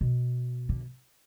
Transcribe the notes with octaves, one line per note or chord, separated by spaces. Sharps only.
B2
D3